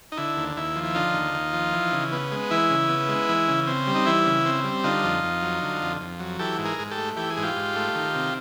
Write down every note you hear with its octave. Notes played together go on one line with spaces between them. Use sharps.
D#4
D3 E4
D#2
D#2 E4
F3
E4
D3 D#4 F4
D#2
D#2
F3
E3
C#3
B3
G#3
E3 E4
C#3
B3
G#3
E3
C#3
C4
G3
D#4
E3 E4
C#3
C4
G3
D3 D#4 F4
F2
F2
F#3
D3
F2
F2
F#3
E3 G4 A4
G#2
G#4 A#4
G#2
G4 A4
A3
E3 G4
G#4
G#2
F4 G4
G#2
A3
D#3
C3